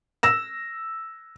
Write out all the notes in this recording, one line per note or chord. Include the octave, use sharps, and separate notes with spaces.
E6 A#6 E7